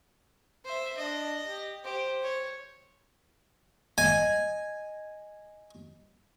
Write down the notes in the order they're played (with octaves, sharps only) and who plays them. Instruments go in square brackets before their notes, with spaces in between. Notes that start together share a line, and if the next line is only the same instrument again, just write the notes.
[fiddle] C5 E5
[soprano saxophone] D4 [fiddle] D#5
[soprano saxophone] G4
[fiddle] G4 [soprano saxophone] C5
[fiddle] C#5
[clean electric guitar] D#5 [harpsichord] G#5